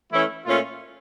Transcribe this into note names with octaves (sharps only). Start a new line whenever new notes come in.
E3 A3 C#4 E4
A#2 A3 C#4 F4